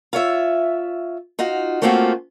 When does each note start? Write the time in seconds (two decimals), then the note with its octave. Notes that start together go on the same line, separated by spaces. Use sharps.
0.13 F4 C#5 E5
1.39 D#4 F4 F#4
1.82 A3 A#3 C4 C#4 F4 F#4